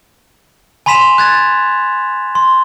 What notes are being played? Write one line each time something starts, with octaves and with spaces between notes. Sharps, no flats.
G#5 B5 C6 B6 E7 F7
F#6 G#6 A6
C6